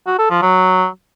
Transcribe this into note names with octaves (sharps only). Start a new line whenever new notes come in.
F#4
A4
F3
F#3